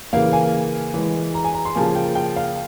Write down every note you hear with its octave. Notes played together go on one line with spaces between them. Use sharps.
C#3 E3 A#3 F5
G#5
E3 G#3
A#5
G#5
A#5
C6
C#3 F3 A#3 G#5
G5
G5
F5